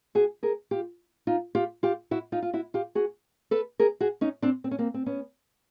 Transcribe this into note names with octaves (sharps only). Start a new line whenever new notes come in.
F#4 G#4
G#4 A#4
F4 G4
D#4 F4
F4 G4
F4 G4
E4 F#4
D#4 F4
F4
E4 F#4
F4 G4
F#4 G#4
A4 B4
G#4 A#4
F#4 G#4
C#4 D#4
C4 D4
C4
C#4
A#3 C4
C4
B3 C#4